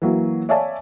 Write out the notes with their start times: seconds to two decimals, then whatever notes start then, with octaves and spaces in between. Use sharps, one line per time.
0.02 E3 F#3 A#3
0.49 C#5 D5 E5 F5 G#5 A5